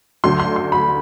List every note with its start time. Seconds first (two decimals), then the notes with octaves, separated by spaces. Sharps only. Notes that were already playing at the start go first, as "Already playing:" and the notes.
0.24 D2 D3 F#3 C6
0.40 C6
0.56 C6
0.72 B5